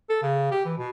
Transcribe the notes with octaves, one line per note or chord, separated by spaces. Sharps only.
A4
C#3
G4
E3
B2